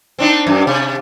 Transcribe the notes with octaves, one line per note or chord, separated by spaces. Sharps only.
C4 D4 D#4
F#2
C3